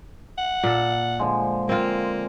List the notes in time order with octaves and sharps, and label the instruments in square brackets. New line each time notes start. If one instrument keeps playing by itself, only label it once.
[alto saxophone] F#5
[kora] A#2 A4
[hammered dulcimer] D3 F3 G#3
[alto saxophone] A#3 [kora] C4 F4